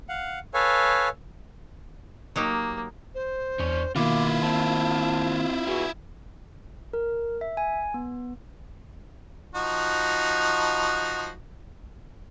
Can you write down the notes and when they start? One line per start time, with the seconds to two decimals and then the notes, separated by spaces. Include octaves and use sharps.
0.09 F5 F#5
0.54 A4 B4 C#5 F5 G#5
2.36 F#3 A#3 D#4 G4
3.15 C5
3.60 E2 D4 C#5
3.96 B2 D#3 A#3 E4 F4 D6
4.42 C4 A5
5.67 B3 F#4 G#4
6.93 A#4
7.41 E5
7.57 G#5
7.94 B3
9.55 F3 D#4 F#4